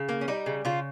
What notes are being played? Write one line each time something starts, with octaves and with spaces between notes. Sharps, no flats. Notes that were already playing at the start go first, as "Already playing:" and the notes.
Already playing: C#3
A#3
C#4
G3 D#4
C#3
C#3 F4